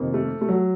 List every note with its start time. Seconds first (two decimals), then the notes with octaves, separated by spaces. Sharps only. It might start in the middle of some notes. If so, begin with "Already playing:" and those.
Already playing: F2 C3 D#3 A#3
0.14 A3
0.41 A3
0.49 F#3